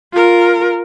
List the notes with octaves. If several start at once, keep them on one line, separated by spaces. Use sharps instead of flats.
F4 A#4